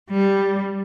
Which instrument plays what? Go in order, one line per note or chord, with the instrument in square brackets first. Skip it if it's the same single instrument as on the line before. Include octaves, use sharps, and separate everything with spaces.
[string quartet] G3